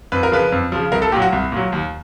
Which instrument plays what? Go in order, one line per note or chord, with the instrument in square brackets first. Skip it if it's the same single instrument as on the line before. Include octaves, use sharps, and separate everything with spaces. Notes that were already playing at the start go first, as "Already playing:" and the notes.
[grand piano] F2 B4
A#4
C#3 F3 B4
F2
C#3 F3
C2 A#4
A4
A#2 F#3 G4
F#4
C2
A#2 F#3
D#2